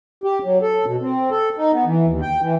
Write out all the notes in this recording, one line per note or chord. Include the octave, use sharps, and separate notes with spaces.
G4
F#3
A4
B2
C4
A4
D#4
B3
E3
D#2
G5
E3